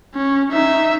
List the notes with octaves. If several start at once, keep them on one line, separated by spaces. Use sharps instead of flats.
C#4
D#4 E5